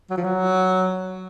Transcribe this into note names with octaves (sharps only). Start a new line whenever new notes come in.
F#3
F3
F#3